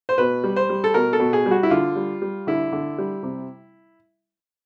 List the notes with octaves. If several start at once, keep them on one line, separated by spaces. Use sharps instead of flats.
C5
B2 B4
G3
C5
G3
A4
B2 A#4
A4
B2
G#4
G3
F#4
E4
D3 F4
G3
G3
D3 E4
D3
G3
C3